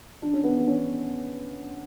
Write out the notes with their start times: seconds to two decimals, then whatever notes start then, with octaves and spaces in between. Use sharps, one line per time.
0.22 D4
0.33 C#4
0.44 B3
0.54 C#4
0.67 C#4